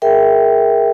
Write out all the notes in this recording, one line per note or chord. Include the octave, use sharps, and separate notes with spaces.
G#4 A#4 E5 G5